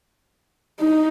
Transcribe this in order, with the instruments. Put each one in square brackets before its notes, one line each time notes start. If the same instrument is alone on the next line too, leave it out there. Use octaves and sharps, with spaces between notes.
[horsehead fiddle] D#4